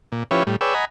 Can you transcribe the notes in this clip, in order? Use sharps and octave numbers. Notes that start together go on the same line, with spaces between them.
A#2
F3 C#4 E4 G4 B4 C#5
A2 G3
G#4 B4 C#5 D5 G5 E6
D#5 F#5 G#5 A#5 B5